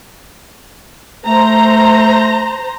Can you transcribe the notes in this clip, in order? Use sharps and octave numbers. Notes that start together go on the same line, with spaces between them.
A3 C5 A#5